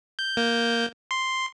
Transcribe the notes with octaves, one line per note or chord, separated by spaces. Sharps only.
G6
A#3 G6
C6